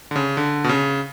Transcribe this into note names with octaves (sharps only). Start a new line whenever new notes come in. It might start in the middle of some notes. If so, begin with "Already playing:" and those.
D3
C#3
D3
B2
C#3